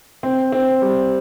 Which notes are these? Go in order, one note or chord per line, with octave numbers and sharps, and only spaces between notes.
C4
C4
G3